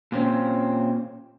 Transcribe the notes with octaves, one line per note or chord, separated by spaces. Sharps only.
A#2 C4 C#4